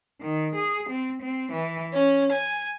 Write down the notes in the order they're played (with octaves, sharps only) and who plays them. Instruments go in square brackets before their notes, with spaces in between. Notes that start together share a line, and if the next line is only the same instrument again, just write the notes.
[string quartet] D#3
G#4
C4
C4
E3
C#4
G#5